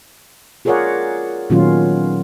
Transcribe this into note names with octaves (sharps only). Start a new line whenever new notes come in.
F4 G#4 A#4 C#5 D5 F#5
A#2 D#3 F#3 B3 C#4 F4